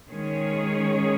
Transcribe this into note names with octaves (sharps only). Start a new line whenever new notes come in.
D#3 G#3 C#4 G#4 C#5